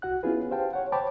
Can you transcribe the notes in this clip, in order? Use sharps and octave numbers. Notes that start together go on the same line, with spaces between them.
C2 F#4 F#5 F#6
B3 C#4 E4 F4 G#4 B4
G4 C5 F5 G5 A5
C#5 F#5
C5 C#5 G5 A5 B5 D6